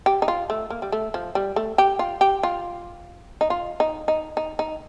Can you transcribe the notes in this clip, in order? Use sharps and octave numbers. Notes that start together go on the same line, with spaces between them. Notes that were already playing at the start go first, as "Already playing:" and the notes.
G4
D#4
F4
A3
A#3
G3
A3
F3
G3
A3
G4
F4
G4
F4
D#4
F4
D#4
D#4
D#4
D#4